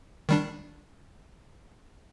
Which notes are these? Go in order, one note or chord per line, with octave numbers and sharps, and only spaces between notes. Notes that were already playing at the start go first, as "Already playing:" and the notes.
D#3 G3 D4